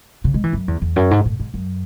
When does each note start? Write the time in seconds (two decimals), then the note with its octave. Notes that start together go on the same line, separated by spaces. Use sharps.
0.24 C#3
0.34 G#3
0.44 E3
0.53 F#2
0.68 E2
0.82 E2
0.96 F#2
1.11 G#2
1.25 A2
1.39 G#2
1.54 F#2